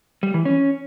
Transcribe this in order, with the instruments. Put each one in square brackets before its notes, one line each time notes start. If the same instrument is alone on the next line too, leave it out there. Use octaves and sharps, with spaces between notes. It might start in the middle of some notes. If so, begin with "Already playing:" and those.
[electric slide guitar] G3
E3
C#4